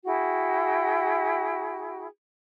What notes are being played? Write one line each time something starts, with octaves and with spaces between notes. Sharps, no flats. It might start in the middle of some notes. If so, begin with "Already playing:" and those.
E4 F#4 G#4 G5